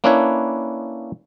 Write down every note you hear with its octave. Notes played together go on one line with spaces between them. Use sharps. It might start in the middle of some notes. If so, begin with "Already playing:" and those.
A#3 C#4 D4 E4 B4 C#5